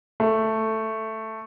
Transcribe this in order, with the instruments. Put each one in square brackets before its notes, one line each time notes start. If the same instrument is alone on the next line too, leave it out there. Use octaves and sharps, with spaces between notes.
[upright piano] A3